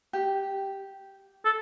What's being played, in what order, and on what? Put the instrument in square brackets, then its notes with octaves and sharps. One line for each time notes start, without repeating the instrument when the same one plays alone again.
[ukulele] G4
[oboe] A4